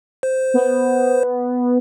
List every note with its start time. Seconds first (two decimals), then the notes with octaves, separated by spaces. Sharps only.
0.23 C5
0.54 B3